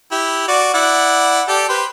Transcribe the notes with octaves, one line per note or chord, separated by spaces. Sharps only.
E4 G4
F#4 D5
E4 D5 F#5
G4 A4 D5
G4 B4 C5